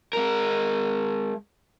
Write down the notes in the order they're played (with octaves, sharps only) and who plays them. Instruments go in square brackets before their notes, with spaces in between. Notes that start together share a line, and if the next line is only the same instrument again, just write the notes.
[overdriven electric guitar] G#3 A#4